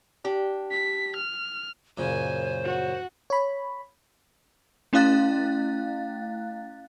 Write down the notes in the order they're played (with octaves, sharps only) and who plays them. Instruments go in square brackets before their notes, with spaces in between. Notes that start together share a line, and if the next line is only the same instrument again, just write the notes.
[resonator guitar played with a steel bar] D4 G4
[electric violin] B6
F6
[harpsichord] F#2 A#2 C#3 [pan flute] C5 [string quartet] G#5
[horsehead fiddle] F#4 [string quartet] F#5
[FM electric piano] C#5 B5
[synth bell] A3 C#4 E4 F5 F#6 A6